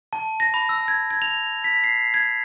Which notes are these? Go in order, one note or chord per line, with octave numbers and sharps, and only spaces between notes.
A5
A#6
B5
E6
G#6
G#6
F7
B6
C7
G#6